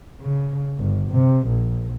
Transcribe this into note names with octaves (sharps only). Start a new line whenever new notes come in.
C#3
G1
C3
A#1